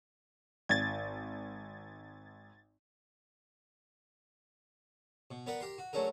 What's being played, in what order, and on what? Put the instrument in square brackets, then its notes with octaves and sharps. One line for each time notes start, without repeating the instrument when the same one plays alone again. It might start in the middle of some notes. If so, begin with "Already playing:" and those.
[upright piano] G#1 [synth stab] G#6 A6
[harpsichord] B2
B3 A#4 B4 D5 F#5
G4 A#4 C6
F#4
F#3 A3 C#4 D4 G#4 A#4